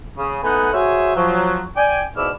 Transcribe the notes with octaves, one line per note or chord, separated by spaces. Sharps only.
C#3
A3 B3 D#4 B4 F#5 G#5
F#4 G#4 C5 C#5 E5
F3 F#3
D5 G5 G#5
G#2 B2 E4 D5 E6 F6